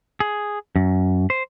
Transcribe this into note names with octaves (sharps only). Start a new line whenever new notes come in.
G#4
F#2
C5